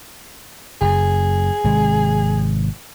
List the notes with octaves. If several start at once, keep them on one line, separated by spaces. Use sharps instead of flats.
F#1 F#2 G#4
G#1 C3 G#3